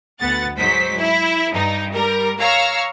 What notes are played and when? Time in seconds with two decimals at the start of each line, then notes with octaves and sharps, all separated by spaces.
0.20 D2 B3 F#5 A6
0.57 G#2 F#3 C5 B6
0.98 E4
1.51 G2 D#4
1.93 G3 A#4
2.39 C#5 F5 A#5 C#6 E6 F6